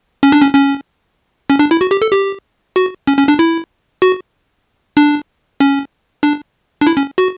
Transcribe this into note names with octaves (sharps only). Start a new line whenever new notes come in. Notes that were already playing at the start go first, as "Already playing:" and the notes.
C#4
D4
C#4
C#4
C#4
D4
E4
F#4
G4
A4
G4
F#4
C#4
C#4
D4
E4
F#4
D4
C#4
D4
D4
E4
C#4
F#4